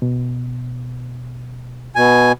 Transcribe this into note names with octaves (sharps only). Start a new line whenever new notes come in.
B2
B2 G#5